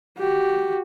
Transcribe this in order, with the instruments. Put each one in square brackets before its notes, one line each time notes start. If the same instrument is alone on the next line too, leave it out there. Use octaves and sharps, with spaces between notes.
[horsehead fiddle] F#4 G4